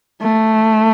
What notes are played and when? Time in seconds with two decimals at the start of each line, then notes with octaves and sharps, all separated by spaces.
0.22 A3